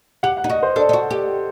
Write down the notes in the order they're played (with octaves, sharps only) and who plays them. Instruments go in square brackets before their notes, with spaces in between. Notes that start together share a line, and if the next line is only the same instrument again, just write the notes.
[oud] G4 [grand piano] F#5
[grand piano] F#5
[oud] D#4
[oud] F#4 [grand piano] D#5
[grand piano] C5
[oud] D4 [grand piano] A4
[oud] D#4
F#4
G4